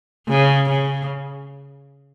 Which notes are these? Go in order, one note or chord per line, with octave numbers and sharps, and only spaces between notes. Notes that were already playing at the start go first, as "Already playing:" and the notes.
C#3
C#3